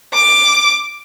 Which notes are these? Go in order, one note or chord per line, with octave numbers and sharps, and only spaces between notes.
D6